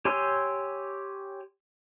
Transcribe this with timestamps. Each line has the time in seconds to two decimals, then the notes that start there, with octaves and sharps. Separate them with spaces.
0.05 G4 C#5 G#5 C6 E6